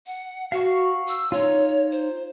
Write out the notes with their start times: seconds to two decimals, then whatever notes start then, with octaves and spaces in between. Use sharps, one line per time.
0.07 F#5
0.52 F#4 F5 F#5 C#6
1.08 E6
1.32 D#4 F4 C#5
1.92 C5